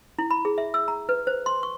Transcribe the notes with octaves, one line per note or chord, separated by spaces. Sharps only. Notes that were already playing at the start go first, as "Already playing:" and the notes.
E4
B5
G#4
E5
E6
A#5
B4
C5
C6
C#6